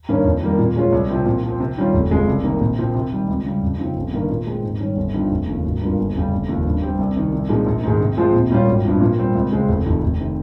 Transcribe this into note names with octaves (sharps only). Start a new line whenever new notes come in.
G2 D#3 A#3 C#4
F2
D#3 G3 A#3
A#2
G#3 C#4 F4
C2
C3 F3 C4
A#2
F3
C4
C3
D#3 G3 C#4 F4
F1
F2 C#3 G#3
C2
C3 D#3 A#3
A#1
A#2 F3 C4
C3
D#3 G3
C#2
C#3 G3
F2
C#3 F3 C4 D#4
G1
G2 D#3 A#3
A#2
G#3 C4
G#2
D#3 G3 C#4
G1
G2 F3 C4 D#4
F1
D#2 C#3 F3
G#1
G2 G3 A#3 F4
G1
F2 C#3 G3
F1
D#2 C#3 F3
G2
G3 C4 G4
C2
C3 D#3
C2
A#2 F3 G#3 D#4
A#1
G#2 D#3 G#3
C3
F3 G#3 C4 F4
A#1
A#2 G3 C#4 F4
G#1
G2 F3
A#2
G3 C4
C#2
C#3 G#3 C4
F1
F2 C3 D#3
F1
C3 D#3